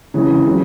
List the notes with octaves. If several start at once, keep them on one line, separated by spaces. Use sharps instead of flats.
C#3 E3 G#3
C#3 F#3